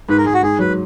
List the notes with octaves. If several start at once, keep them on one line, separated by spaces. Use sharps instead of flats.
G#2 B4
A#4
G#2 G#4
F#4
G#2 G#4
F#3 B4